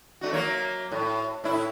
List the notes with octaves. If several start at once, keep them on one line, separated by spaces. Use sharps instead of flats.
A3 D#4 F#4
F#3 A#3 C#5
A2
A2 E4